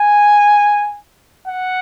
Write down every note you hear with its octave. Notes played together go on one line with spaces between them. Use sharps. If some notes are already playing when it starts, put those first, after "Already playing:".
Already playing: G#5
F#5